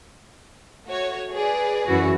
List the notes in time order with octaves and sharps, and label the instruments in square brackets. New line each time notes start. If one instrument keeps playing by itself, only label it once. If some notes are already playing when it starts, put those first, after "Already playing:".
[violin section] A3 F#4 C#5
G#4 B4 D5
[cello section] F#2 E3 F#4